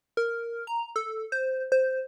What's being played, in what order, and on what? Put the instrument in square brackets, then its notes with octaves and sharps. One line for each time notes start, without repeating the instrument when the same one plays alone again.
[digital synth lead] A#4
A#5
A4
C5
C5